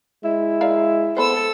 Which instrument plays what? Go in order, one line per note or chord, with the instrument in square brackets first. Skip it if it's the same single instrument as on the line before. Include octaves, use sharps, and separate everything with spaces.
[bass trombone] G#3 [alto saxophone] E4
[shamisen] A#4 D5 F5
[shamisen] B3 C5 [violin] A4 E6